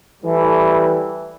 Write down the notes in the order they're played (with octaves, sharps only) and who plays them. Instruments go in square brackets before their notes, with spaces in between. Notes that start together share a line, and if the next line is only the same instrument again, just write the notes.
[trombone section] E3 G3 A3